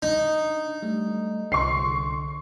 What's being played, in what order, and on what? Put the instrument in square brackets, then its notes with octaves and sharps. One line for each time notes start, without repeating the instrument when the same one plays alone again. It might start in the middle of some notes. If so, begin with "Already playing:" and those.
[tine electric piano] D4 [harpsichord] D#4
[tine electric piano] G3 A3
[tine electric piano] C2 D3 [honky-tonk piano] C6 C#6 C7